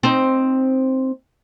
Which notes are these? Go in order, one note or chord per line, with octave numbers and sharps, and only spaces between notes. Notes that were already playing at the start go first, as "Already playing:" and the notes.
C4 D#4